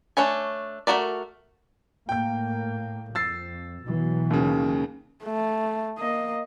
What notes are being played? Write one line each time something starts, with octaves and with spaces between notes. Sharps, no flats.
A3 D4 C#5 G#5
A3 E4 F#4 A#4 D5
A2 A#3 G5 G6
F2 E6 A6 C7
B2 E3 F#3
D#2 C#3
A3
A#3 D#5